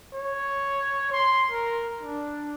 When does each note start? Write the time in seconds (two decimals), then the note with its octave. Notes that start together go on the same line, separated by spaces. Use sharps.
0.13 C#5
1.12 C6
1.51 A#4
2.01 D4